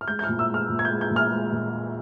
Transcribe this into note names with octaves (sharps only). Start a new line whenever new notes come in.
F6
G#3 G6
G6
F6
A#2
E6
G#3 F6
A#2
G#6
G6
G#3
G6
A#2
F6
G#3
A#2